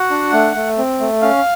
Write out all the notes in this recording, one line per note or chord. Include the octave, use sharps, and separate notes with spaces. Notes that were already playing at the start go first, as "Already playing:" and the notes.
Already playing: F#4 F#5
D4
A3
A3
C4
A3
C#4 F5